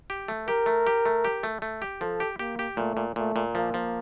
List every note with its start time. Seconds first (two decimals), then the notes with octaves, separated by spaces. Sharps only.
0.10 G4
0.28 A3
0.48 G4 A#4
0.66 A3
0.87 G4
1.06 A3
1.24 G4
1.43 A3
1.62 A3
1.82 G4
2.01 F3 A4
2.20 G4
2.39 A#3 G4
2.59 G4
2.77 A#2 A3
2.97 A#2
3.16 A#2 A3
3.36 A#2
3.55 F3 A#3
3.74 F3